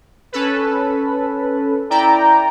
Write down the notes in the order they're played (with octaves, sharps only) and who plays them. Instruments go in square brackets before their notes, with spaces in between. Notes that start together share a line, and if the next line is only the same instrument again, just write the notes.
[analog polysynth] C#4 A4 B4
[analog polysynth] E4 D5 G5 [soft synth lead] A#5